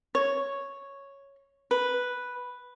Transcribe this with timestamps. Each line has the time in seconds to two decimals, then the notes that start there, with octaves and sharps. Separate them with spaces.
0.15 C#5
1.71 B4